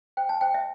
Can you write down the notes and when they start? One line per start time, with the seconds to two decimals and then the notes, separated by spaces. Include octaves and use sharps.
0.17 C5 G5
0.29 A5
0.41 C5 G5
0.54 E5